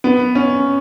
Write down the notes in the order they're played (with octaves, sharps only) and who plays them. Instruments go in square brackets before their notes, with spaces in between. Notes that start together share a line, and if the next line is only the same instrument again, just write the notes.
[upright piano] B3
C#4